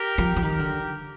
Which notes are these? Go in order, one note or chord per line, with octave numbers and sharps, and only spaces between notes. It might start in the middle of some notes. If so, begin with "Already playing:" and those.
Already playing: G4 A#4
F3
F3
D#3 G4 A#4
D3